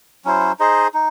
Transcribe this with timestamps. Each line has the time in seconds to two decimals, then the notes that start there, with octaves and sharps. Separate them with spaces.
0.25 F#3 C#4 E4 C5
0.59 D#4 G#4 C5 D#5
0.94 D#4